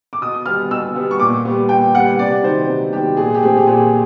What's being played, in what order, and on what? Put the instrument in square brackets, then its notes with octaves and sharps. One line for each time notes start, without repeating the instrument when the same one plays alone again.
[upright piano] D6
B2 D#6
G3 B3 F6
B2 E6
G3 B3
C#6
A#2 D6
G3 B3
A#2 G5
G3 B3 F#5
C3 D5
D#3 F#3 B3 C5
C3
D#3 F#3 B3 G4
A#2 G#4
G4
F3 A3 C4 G#4
G4
A#2 G#4